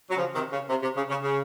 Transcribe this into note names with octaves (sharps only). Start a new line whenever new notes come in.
F#3
C#3 F3
C3 D#3
C#3
C3
C3
C#3
C#3
C#3